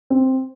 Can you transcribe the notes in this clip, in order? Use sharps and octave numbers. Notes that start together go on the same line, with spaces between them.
C4